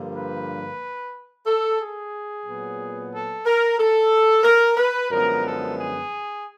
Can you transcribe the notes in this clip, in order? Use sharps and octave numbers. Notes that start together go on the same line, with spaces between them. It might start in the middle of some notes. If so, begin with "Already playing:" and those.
Already playing: G2 D3 F3 A#3
B4
A4
G#4
A#2 F#3 B3
A4
A#4
A4
A#4
B4
F#2 D3 F3 G#3 B3 A#4
A4
G#4